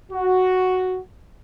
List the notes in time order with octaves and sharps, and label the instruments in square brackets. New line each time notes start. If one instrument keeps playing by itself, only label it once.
[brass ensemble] F#4